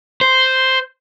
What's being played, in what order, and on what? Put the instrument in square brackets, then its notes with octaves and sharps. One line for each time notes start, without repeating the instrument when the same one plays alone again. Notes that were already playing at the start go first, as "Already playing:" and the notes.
[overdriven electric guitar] C5